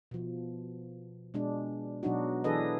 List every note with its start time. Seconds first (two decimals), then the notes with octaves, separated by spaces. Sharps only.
0.11 B2 F3
1.34 B2 G#3 D4
2.03 B2 F#3 D4 D#4 F#4
2.44 E3 D4 G#4 A4 B4 D#5